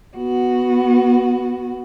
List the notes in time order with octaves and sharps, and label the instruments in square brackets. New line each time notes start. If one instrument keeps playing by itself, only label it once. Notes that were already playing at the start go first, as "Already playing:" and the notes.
[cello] B3 F#4